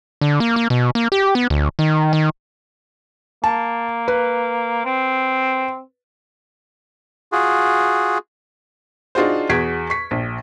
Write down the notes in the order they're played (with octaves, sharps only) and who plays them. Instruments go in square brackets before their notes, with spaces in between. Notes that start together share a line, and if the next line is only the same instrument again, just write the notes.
[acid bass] D3
A#3
A#3
B2
A#3
G4
B3
D2
D#3
D#3
[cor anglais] A#3 [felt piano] A5
[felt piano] B4
[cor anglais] C4
[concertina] F4 F#4 G#4
[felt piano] D4 D#4 F4 F#4 G#4 C5
E2 F#4 G#4 G#6 B6 D7
C#6 B6
A#1